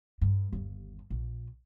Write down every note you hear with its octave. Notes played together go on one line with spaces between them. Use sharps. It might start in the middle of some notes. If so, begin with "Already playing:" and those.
G2
G1 D#2
A#1